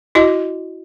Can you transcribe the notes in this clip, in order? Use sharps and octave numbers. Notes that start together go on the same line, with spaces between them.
E4 F#4 D#5